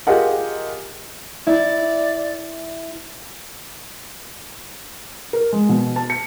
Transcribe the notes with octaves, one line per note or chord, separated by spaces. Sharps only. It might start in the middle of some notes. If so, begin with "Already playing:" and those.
F4 G4 G#4 A#4 D#5 F#5
E4 D5
A#4
G#3
B2
A5
C#7